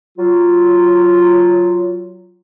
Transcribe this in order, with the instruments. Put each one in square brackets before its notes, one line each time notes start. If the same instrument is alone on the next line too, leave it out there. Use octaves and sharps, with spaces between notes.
[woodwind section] F#3 F4